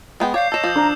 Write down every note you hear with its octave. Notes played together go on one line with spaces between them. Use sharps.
G#3 B3 G5
C#5 D5 F5 D6 G6 C7
C#5 D#5 A5 E6 E7
F3 D#6 G6
D4 A#5